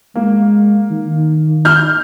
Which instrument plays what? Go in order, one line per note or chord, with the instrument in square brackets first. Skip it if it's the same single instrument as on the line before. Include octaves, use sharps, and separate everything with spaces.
[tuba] G#3 [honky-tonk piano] A#3
[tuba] D#3
[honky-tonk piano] F6 G6